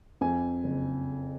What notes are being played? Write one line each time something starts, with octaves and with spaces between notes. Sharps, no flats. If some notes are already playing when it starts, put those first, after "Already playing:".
F2 G#5
F#1